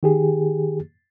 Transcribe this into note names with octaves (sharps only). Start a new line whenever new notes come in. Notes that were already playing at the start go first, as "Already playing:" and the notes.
D#3 G4 G#4